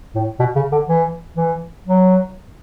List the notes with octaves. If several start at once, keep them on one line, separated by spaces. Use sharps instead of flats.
A2
B2
C#3
D3
E3
E3
F#3